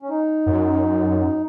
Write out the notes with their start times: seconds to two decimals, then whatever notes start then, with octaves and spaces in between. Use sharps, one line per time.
0.02 C#4
0.09 D#4
0.46 F#2